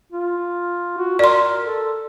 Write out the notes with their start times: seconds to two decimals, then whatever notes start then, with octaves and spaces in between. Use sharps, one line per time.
0.12 F4
0.98 F#4
1.19 A#4 D5 C6
1.64 A4